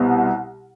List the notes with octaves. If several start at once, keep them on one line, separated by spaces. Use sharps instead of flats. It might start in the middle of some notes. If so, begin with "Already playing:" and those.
Already playing: C2 B2 B3